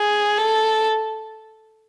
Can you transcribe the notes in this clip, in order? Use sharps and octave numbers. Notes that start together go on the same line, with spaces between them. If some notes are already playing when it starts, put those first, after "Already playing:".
Already playing: G#4
A4